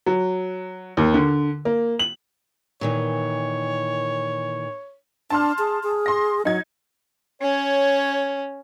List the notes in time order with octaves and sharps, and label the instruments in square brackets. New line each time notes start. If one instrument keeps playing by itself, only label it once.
[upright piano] F#3
D#2
D3
A#3
F#7
[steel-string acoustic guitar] A#2 D#3 E3 [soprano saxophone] C#5
[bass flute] D4 [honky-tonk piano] A5 C6 F6
[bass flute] G#4
G#4
[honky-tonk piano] C6 A#6
[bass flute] F#3 [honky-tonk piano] D#4 G#6
[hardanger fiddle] C#4 [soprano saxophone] C#5